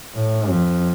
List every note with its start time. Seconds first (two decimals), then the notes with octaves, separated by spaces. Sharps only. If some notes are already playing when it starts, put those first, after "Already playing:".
0.15 A2
0.50 F2